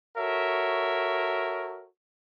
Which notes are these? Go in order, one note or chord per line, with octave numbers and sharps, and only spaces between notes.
F#4 A4 A#4 C#5 E5